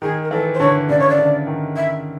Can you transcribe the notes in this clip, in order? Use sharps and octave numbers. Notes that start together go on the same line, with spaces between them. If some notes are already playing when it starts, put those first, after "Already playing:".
D#3 G#4
A#4
E3 A4
C5
D3 C#5
C#3 D5
C#5
D5
D3
D#3
E5